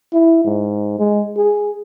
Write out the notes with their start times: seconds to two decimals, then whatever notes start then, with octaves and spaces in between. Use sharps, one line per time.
0.13 E4
0.45 G#2
0.99 G#3
1.37 G#4